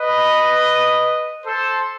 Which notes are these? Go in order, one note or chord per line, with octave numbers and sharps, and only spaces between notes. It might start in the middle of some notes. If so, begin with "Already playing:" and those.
Already playing: B4 D#5
A4 C5